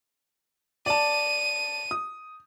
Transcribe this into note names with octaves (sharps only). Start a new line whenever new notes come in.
D5 A5 D#7
D#6